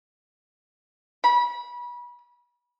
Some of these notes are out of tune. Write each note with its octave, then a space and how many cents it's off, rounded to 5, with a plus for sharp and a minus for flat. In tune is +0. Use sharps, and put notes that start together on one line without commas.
B5 -30